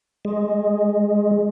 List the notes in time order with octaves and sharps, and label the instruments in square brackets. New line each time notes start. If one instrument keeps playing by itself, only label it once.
[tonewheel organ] G#3